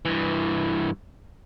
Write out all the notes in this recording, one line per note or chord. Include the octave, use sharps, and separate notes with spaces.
G2 E3